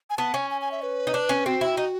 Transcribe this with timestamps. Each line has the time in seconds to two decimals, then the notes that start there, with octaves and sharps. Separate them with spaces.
0.10 G#5
0.18 B3 A5
0.34 C#4 G#5
0.51 G#5
0.61 G#5
0.71 E5
0.82 B4
1.07 D#4
1.14 D4
1.29 C#4
1.46 C4 F#4
1.61 E4
1.77 D#4